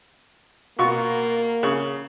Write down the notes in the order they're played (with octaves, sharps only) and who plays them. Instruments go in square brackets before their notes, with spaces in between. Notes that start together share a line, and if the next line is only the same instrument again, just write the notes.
[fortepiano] B2 F4 C#6 [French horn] A#3
[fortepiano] C#3 C#6